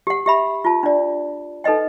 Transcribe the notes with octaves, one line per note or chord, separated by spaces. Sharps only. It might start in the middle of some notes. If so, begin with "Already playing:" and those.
G4 F#5
G4 E5 B5
F4 A5
D4 D5
D#4 A4 B4 D#5 G5